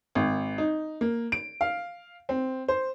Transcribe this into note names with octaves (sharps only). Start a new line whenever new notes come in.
G#1
D#4
A#3
D7
F5
C4
C5